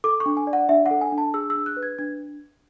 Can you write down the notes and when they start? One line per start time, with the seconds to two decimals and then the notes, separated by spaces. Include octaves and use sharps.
0.04 A4 D6
0.20 C#6
0.26 D4
0.37 G#5
0.47 D5
0.53 F#5
0.69 D4 E5
0.86 F#5
0.91 A4
1.01 G#5
1.12 D4
1.18 A5
1.34 G#4 E6
1.50 E6
1.55 D4
1.66 F#6
1.77 B4
1.83 G#6
1.99 D4 G#6